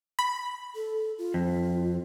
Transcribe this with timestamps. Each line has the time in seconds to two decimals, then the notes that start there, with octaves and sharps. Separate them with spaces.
0.19 B5
0.75 A4
1.18 F4
1.34 F2